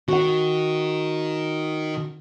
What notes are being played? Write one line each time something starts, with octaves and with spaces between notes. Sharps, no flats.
D#3 F#4 F#5